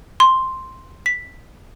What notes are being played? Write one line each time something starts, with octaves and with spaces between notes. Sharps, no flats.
C6
B6